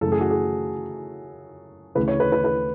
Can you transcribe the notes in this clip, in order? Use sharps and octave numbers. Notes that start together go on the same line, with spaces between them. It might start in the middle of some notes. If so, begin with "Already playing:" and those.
F#2 C#3 E3 A3 A4
G#4
F#4
G#4
D2 C#3 E3 B4
C#5
B4
B4
B4